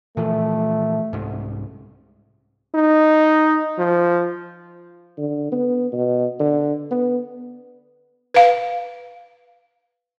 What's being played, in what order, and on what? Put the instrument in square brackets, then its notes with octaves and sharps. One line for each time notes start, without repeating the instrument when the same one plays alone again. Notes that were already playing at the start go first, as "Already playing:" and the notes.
[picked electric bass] A#2 E3 F3 [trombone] A3
[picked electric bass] C2 G#2
[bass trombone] D#4
F3
[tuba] D3
B3
B2
D3
B3
[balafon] B4 F5